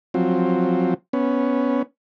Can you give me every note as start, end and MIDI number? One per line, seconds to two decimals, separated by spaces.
0.14 0.94 53
0.14 0.94 54
0.14 0.94 60
1.13 1.82 59
1.13 1.82 61